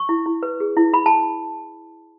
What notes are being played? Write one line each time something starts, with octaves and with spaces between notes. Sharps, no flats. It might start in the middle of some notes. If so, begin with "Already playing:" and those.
Already playing: C#6
E4
E4
B4
G#4
E4
E4 B5
A5